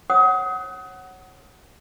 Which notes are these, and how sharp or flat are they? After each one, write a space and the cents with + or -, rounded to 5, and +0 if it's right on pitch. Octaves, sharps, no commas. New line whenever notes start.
C#5 -25 F#5 +10 D#6 +30